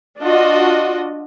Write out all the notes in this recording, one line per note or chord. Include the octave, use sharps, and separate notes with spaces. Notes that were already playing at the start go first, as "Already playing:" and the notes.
D4 F4 F#4 D#5